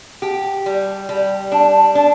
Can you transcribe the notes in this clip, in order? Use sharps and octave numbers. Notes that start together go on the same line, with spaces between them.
G4
G3
G3
D4
D4